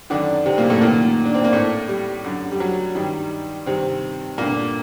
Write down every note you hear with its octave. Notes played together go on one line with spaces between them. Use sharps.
F#2 D3 D#3 D4
C3 C4
A#2 A#3
A2 A3
F#2 A#2 D#3 A#3
D4
C4
A#3
A2 A3
G3
F#2 D3
G3
F#3
G2 D#3 G3
G2 C3 D#3 C4
G2 A#2 D3 A#3